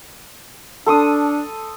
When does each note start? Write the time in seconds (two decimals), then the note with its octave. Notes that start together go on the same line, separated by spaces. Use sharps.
0.86 D4 A4 C6 D#6